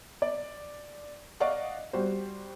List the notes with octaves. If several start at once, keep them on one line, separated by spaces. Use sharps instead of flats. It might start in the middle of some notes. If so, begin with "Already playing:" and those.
D5
D5 D#5 F5 F#5 C#6
G3 F#4 C5